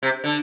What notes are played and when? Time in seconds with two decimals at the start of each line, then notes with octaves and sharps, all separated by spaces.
0.03 C3
0.24 D3